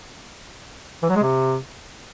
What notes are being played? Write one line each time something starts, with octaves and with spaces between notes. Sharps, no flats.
E3
F#3
G#3
C3